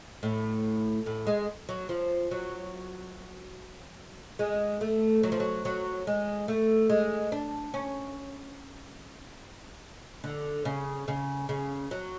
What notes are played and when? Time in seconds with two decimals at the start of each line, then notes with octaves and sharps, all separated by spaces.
0.23 A2
1.06 A2
1.27 G#3
1.69 F#3
1.89 F3
2.31 F#3
4.39 G#3
4.81 A3
5.23 F#3
5.32 F3
5.40 F#3
5.65 F#3
6.07 G#3
6.48 A3
6.90 G#3
7.32 D4
7.74 C#4
10.24 D3
10.65 C#3
11.08 C#3
11.49 C#3
11.91 F#3